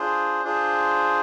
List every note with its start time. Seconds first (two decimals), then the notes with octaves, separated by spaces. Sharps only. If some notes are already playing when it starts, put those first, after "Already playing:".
Already playing: D4 F4 G#4 C5
0.43 D4 F4 G#4 C5